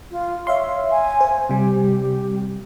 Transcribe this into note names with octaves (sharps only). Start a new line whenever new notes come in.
F4
C#5 E5 F5 C6
G#5
C5
C3 G3 G4